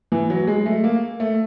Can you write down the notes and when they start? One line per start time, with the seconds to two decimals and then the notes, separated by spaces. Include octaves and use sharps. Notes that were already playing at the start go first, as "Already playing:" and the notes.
0.12 E3
0.30 F#3
0.47 G#3
0.66 A3
0.84 A#3
1.20 A3